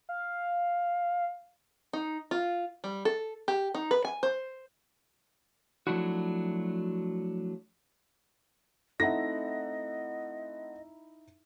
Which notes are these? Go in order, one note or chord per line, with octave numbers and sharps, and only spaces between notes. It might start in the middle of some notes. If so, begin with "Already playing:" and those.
F5
D#4
F4
G3
A4
G4
D#4
B4
G#5
C5
F3 F#3 A3 D4 E4 F#4
A3 C4 D#4 E4 D#5 E5 F#5 A#6